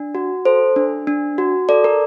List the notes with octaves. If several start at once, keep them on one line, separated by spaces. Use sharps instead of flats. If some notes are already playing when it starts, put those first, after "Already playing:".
Already playing: D4
F#4
A4 C5
D4
D4
F#4
A4 D5
A#4